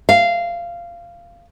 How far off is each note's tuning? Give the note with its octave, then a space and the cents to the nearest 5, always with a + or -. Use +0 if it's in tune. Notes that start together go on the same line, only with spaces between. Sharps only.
F5 -15